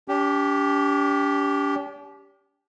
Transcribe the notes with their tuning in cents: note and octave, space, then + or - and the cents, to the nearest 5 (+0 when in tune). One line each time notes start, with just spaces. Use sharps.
D4 -45 G4 +0